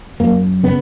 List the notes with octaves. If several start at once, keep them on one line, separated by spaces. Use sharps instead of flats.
F#2 A#3
C#3 B3